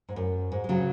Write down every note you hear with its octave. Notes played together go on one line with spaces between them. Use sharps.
G#2
F#2
G#2
G#3
C#3 F#3